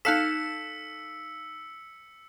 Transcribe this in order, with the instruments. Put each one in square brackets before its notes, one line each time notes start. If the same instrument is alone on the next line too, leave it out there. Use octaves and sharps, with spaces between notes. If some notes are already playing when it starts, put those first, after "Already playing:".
[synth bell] D#4 E7 [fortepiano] A4 F5 F#6 [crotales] E6 C#7 [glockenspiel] B6